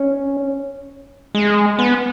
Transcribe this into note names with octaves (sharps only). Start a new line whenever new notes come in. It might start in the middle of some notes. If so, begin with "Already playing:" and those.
Already playing: C#4
G#3
B3